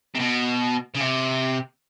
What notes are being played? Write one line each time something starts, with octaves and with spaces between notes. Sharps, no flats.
C3
B2
C#3
C3